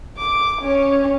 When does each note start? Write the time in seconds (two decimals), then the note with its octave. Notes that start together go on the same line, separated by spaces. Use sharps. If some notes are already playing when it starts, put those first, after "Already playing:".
0.18 D6
0.62 C#4